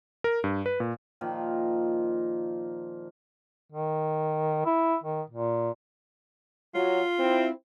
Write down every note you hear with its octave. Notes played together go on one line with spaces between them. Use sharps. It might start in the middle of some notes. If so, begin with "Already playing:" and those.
A#4
G2
B4
A#2
A#2 D#3 F3
D#3
E4
D#3
A#2
F#3 F4
C4 E4